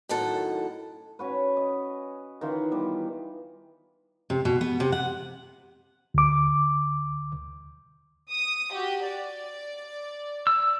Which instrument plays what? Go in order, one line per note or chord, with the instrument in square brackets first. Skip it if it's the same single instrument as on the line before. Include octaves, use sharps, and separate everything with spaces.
[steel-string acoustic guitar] F#2 A2 D#3 A4 F#5
[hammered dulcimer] C#4 F#4 B4
D#5
D#3 E3 F4 F#5
G3 B3
[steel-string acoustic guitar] C3
B2
B3
C3
F#5
[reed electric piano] D2 D6
[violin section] D#6
F#4 G4
D5
[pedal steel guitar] E6